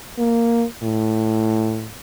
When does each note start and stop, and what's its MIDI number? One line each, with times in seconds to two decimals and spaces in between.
0.19 0.65 58
0.83 1.90 45